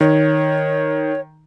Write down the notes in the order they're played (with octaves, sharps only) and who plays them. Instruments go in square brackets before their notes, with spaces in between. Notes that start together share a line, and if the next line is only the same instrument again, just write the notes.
[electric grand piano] D#3 [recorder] C#5